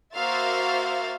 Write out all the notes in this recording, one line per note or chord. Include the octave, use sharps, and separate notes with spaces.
A#3 F#4 C5 E5 F5 A6